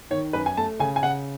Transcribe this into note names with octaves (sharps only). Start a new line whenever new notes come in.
D#3 C#5
F#2 B4
G#5
A3 A5
C#3 G#5
G#5
C#3 F#5